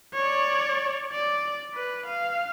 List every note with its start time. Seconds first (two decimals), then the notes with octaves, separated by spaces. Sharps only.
0.14 C#5 D5
1.12 D5
1.74 B4
2.06 F5